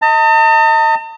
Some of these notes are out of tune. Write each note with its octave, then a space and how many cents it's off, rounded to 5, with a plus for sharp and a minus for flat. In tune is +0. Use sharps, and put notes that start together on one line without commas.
D#5 +20 A5 +45